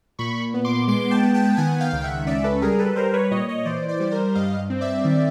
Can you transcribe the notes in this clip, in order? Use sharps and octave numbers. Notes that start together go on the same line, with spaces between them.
A#2 B5 C#6
B3
C6 D6
G#3 C6 D6
G5 A5
B3
G5 A5
D#3 F#5 G#5
F5 G5
C#2
E5 F#5
C#4 D5 E5
A4 B4
G3 G#4 A#4
A4 B4
G3 A#4 C5
B4 C#5
A#2 C#5 D#5
C#5 D#5
E3 C5 D5
C5 D5
G3
A#4 C5
G2 D#5 F5
C4
D5 E5
D#3